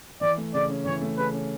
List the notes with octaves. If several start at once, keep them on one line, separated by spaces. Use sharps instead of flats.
E3 D5
A3
C#3 D5
C#4
E3 C#5
A3
C#3 B4
C#4